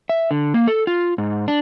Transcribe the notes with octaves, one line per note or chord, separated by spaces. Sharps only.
E5
D3
A#3
A4
F4
G#2
D4